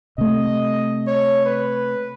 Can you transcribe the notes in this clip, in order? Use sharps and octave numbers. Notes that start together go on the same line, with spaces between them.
C3 A3 D#5
C#5
B4